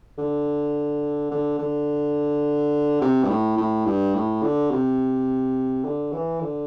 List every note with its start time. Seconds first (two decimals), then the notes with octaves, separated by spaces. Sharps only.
0.18 D3
1.31 D3
1.59 D3
3.01 C3
3.24 G2
3.29 A2
3.57 A2
3.86 G2
4.15 A2
4.42 D3
4.71 C3
5.84 D3
6.13 E3
6.41 D3